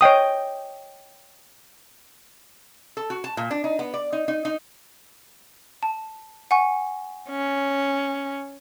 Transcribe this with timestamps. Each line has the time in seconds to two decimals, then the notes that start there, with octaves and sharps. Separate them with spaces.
0.01 C#5 D#5 G5 D#6
2.97 A4
3.10 F#4
3.24 A5
3.37 A#2
3.51 D4
3.64 D#4
3.79 B3
3.94 D5
4.13 D#4
4.28 D#4
4.45 D#4
5.83 A5
6.51 F#5 G#5 C#6
7.30 C#4